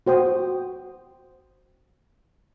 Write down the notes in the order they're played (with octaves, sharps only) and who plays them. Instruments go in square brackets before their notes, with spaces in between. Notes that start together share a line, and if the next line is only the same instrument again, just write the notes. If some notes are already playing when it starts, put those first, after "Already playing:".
[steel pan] F#4 C5 G5 D#6